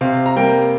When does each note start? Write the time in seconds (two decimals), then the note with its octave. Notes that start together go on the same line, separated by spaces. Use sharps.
0.01 C3 F5
0.26 A#5
0.36 G3 A#3 G5